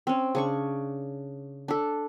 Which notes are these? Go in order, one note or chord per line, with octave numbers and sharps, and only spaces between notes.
C4 C#4
C#3 D4 C#6
D4 A4